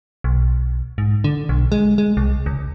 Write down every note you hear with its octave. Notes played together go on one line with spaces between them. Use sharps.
B1
G#2
D3
B1
G#3
G#3
C2
C#2